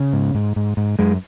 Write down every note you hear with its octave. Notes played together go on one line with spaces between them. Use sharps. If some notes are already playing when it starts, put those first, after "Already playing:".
Already playing: C#3
G#2
G#2
G#2
G#2
F#2 G#3